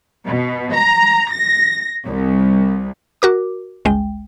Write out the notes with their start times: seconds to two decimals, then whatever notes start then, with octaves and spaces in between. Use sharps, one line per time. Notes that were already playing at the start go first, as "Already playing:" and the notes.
0.26 B2
0.74 A#5
1.31 A#6
2.06 C2
3.22 F#4 A#4 D6
3.85 G1 C#2 G#3 G5